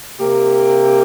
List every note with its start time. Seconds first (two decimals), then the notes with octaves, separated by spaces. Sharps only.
0.19 C3 A#3 G4